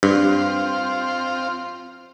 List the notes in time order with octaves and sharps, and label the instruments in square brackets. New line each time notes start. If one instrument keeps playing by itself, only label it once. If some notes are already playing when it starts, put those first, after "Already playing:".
[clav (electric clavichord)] G2 [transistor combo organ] C4 F4